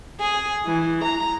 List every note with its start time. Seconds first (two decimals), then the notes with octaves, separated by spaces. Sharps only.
0.20 G#4
0.67 E3
1.04 A#5